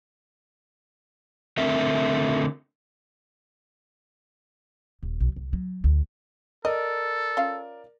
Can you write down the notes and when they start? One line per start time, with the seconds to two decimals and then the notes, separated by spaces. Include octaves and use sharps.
1.58 D3 A3 C4 A#4 E5
5.03 D#1
5.20 B1
5.36 C2
5.53 F#3
5.84 D2
6.65 A4 A#4 D5 D#5
7.37 C#4 F4 F5